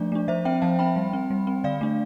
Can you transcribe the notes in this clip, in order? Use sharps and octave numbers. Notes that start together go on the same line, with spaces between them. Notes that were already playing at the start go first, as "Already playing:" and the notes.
Already playing: F3 A3 D4 D5
A3 D4
F3 C5 E5
C4 E5 G5
F3 F5 A5
C4 G5 B5
G3
C4
G3
C4
D3 D5 F5
A3 D4